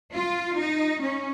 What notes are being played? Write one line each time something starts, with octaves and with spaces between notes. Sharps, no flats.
F4
D#4
C#4